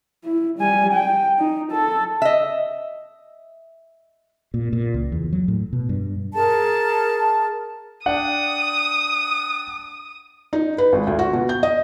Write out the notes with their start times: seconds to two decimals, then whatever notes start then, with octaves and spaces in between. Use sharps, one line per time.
0.24 E4
0.59 G3 G#5
0.93 G5
1.38 D#4
1.72 A4
2.22 D#5 E5
4.54 A#2
4.73 A#2
4.94 C#2
5.12 E2
5.32 F#3
5.48 A2
5.73 B2
5.89 G2
6.34 G#4 A#4 A5
8.06 D4 F#5 G5 D#6
10.53 D#4
10.78 B4
10.93 G#1
11.07 D2
11.19 F#4
11.33 B2
11.49 G6
11.63 D#5